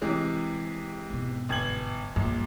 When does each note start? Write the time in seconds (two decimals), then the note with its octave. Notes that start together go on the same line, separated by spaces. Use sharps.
0.02 C3 E3 G#3
1.10 G#2 B2
1.49 G1 G#6 F#7
2.16 A#1 G2